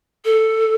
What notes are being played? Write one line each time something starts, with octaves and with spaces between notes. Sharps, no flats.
A4